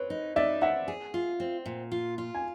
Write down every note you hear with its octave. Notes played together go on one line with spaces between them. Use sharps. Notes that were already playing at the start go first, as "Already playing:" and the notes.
Already playing: C4 B4 C#5
D#4
D#4 D5 E5
C4 E5 F#5
G#4
F4
C4
A#2
F4
F4
G#5